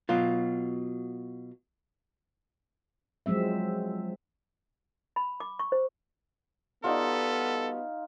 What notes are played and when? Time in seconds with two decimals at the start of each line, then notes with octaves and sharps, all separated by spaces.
0.09 B2 F#3 F4
3.26 F3 F#3 G#3 C4 E5
5.16 B5
5.40 D6
5.59 C#6
5.72 C5
6.84 G3 B3 D#4 F4 F#4 A4 D5